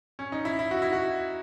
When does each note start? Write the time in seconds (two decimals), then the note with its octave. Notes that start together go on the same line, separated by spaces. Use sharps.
0.19 C#4
0.32 D#4
0.45 E4
0.59 E4
0.71 F#4
0.82 E4
0.93 F#4